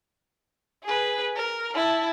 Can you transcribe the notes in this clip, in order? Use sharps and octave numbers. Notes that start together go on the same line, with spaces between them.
G#4 B4
A#4
E4 A5